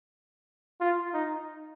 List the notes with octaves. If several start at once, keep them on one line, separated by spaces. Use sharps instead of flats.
F4
D#4